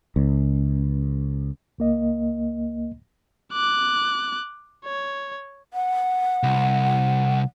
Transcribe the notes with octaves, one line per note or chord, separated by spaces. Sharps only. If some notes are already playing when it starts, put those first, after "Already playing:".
C#2
C#2 A#3 D#5
D6 F#6
C#5
F#5
C2